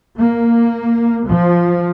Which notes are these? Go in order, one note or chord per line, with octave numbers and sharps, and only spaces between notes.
A#3
F3